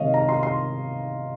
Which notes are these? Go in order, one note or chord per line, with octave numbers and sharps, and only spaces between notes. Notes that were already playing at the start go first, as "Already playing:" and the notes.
Already playing: C3 D#3 G#3 C#5 D#5 F5
A#5
C6
C6